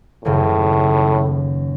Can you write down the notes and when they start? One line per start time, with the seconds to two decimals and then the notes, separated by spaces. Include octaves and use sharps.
0.25 D#1 F#2 A2 C#3